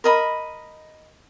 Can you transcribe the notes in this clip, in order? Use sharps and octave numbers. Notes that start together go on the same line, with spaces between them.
A#4 D#5 B5